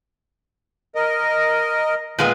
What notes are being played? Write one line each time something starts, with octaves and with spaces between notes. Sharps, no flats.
A#4 D#5
A#2 D#3 G#3 B3